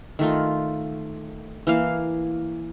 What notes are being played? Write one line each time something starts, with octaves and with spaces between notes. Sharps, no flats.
D#3 A3 F4
E3 A#3 F5